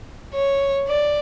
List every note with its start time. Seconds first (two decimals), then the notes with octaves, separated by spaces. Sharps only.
0.34 C#5
0.88 D5